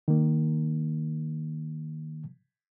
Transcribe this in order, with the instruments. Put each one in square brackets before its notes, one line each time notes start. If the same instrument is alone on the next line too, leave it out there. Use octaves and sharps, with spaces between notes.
[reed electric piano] D#3 A#3